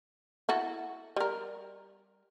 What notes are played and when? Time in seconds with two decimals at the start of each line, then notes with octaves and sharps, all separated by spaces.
0.49 E4 F#4 A4
1.16 G3 A#4